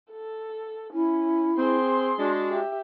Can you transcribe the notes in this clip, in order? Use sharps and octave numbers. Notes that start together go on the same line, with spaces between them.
A4
C#4 E4
C4 G#4 C6
G#3 D4 F#4
G4 E5